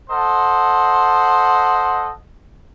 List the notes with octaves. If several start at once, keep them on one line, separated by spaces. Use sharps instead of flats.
A4 C5 D#5 F#5